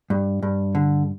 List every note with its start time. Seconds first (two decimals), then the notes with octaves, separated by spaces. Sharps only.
0.10 G2
0.43 G2
0.75 D3